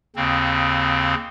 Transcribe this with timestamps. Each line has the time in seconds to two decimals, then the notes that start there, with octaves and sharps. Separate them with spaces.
0.16 D#2 C#3 C4